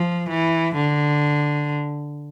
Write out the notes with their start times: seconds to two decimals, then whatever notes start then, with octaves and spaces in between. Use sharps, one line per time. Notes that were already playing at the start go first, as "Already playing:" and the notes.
Already playing: F3
0.29 E3
0.76 D3